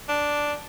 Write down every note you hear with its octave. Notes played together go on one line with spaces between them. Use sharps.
D4